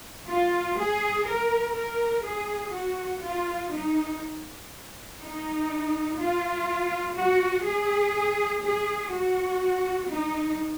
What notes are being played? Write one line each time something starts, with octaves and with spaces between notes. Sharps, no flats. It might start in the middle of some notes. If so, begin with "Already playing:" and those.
F4
G#4
A#4
A#4
G#4
F#4
F4
D#4
D#4
F4
F#4
G#4
G#4
F#4
D#4